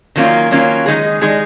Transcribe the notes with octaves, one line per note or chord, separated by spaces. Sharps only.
D#3 F#3 A#3 C#4 F4
D#3 F#3 A#3 C#4 F4
D#3 G#3 D#4 G#4
D#3 G#3 D#4 G#4